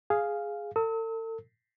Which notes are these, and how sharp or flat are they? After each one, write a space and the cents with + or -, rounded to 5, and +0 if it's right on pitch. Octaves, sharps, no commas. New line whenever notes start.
G#4 +0 F5 +0
A4 +40 E6 -45